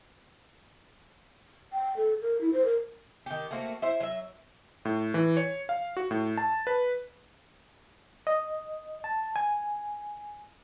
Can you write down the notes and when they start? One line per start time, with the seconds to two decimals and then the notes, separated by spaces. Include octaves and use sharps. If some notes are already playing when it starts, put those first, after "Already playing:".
1.73 G5
1.97 A4
2.22 A#4
2.41 E4
2.53 C5
2.65 A#4
3.26 D#3 G4
3.51 A3 A#3 C4 F#4
3.82 E4 C5 E5
4.00 F#3 E5
4.85 A2
5.14 E3
5.37 C#5
5.69 F5
5.97 F#4
6.11 A2
6.38 A5
6.67 B4
8.27 D#5
9.04 A5
9.36 G#5